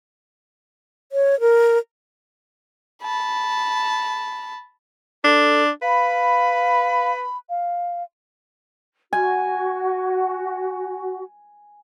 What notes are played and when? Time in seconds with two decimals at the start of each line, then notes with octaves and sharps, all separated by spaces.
1.12 C#5
1.40 A#4
3.03 A5 B5
5.24 D4 A4
5.82 B4 F5 B5
7.50 F5
9.13 F#4 G#5